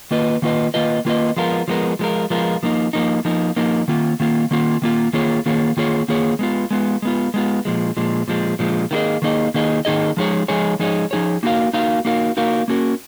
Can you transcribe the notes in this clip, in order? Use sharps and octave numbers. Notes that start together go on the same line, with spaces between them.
D#3 A#3 F4 B4 D#5
D#3 A#3 F4 B4 D#5
D#3 A#3 F4 B4 D#5
D#3 A#3 F4 B4 D#5
F3 G#3 B3 F4 A#4
F3 G#3 B3 F4 A#4
F3 G#3 B3 F4 A#4
F3 G#3 B3 F4 A#4
F3 A#3 D#4
F3 A#3 D#4
F3 A#3 D#4
F3 A#3 D#4
D#3 A#3 F4
D#3 A#3 F4
D#3 A#3 F4
D#3 A#3 F4
D#3 A#3 F4 G#4 C#5
D#3 A#3 F4 G#4 C#5
D#3 A#3 F4 G#4 C#5
D#3 A#3 F4 G#4 C#5
G#3 B3 F4
G#3 B3 F4
G#3 B3 F4
G#3 B3 F4
A#2 F3 G#3
A#2 F3 G#3
A#2 F3 G#3
A#2 F3 G#3
D#3 A#3 D#4 G#4 D#5
D#3 A#3 D#4 G#4 D#5
D#3 A#3 D#4 G#4 D#5
D#3 A#3 D#4 G#4 D#5
F3 G#3 D#4 G#4 C#5
F3 G#3 D#4 G#4 C#5
F3 G#3 D#4 G#4 C#5
F3 G#3 D#4 G#4 C#5
A#3 D#4 F#4 A#4 F5
A#3 D#4 F#4 A#4 F5
A#3 D#4 F#4 A#4 F5
A#3 D#4 F#4 A#4 F5
A#3 C#4 F#4 A#4